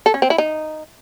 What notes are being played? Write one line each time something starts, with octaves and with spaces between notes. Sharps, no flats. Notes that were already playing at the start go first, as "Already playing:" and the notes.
A4
C#4
C4
E4
D#4